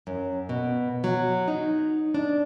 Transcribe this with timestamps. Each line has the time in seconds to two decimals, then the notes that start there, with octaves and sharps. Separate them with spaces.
0.07 F#2
0.49 B2
1.04 F#3
1.48 D#4
2.14 D4